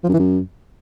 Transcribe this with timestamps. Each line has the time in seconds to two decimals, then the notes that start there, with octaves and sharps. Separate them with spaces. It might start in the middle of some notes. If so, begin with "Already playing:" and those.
0.04 F3
0.09 F#2
0.14 E3
0.19 F#2